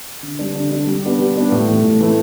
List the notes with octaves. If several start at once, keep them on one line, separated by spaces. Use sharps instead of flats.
D3
G3 D4
D3
G3 D4
G3
B3 D4 G4
G3
B3 D4 G4
A2
E3 A3
A2
E3 A3